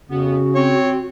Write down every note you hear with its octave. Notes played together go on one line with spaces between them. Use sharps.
F2 C#3 B3 F#4
C4 C#5